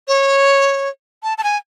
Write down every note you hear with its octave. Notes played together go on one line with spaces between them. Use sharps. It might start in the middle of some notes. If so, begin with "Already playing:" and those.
C#5
A5
A5
G#5